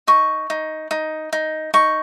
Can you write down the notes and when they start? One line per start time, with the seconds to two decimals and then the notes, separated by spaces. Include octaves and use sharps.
0.07 D#4 C#6
0.50 D#4
0.91 D#4
1.33 D#4
1.74 D#4 C#6